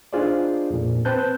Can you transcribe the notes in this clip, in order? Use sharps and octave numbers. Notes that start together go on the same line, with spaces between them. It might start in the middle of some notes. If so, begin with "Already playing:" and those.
D4 D#4 F4 G#4 C5 D5
F2 A#2
C4 B4 C5 A5 F#6 G6